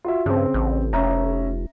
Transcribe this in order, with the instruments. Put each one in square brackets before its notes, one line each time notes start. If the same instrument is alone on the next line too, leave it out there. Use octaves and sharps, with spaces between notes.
[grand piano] F4 F#4 E5
[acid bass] G2 [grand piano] C#3 C4
[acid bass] A1
[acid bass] F1 [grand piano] C#4 E5 A#5